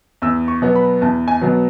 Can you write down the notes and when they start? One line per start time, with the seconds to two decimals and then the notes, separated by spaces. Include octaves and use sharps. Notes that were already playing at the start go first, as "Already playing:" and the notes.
0.22 E2 E6
0.48 C#6
0.62 B2 F#3 B3
0.76 B5
1.01 E2 A5
1.28 G#5
1.41 B2 F#3 B3